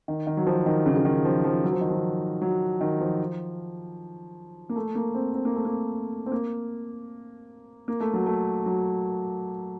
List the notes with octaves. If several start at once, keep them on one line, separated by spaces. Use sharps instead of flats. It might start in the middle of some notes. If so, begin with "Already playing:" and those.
D#3
D#3
F#3
F3
D#3
C#3
C#3
D#3
F3
F3
F#3
F3
D#3
F3
F#3
D#3
F3
A#3
A3
A#3
C4
C4
A#3
A3
A#3
C4
A#3
A#3
A3
F#3
A3
F#3